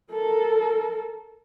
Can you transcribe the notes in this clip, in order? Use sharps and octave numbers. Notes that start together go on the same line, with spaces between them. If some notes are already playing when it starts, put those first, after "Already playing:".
A4 A#4